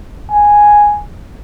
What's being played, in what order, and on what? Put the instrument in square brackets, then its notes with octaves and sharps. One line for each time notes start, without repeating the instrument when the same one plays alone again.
[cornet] G#5